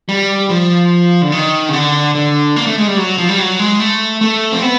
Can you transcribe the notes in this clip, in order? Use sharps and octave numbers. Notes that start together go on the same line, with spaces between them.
G3
F3
D3
D#3
C#3
D3
D3
A#3
A3
G#3
G3
F#3
F3
G3
F#3
G#3
A3
A3
C4
B3